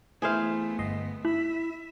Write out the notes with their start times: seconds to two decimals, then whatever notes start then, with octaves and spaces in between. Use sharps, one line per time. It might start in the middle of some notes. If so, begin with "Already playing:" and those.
0.22 E3 A3 B3 E4 G#4 C5 F5
0.79 G1 D#5 C6
1.25 E4 E5 B5